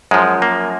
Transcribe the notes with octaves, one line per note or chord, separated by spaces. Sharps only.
F#2 F3 G#3
A#3